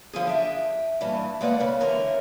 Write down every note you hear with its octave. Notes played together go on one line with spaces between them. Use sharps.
D3 F3 C#4 G#4
D4 E5 G5
G2 A#2 E3 A5
G#3 A#3 B4 D5 E5 F#5
C#3 B4
D3 E3 A#4 C#5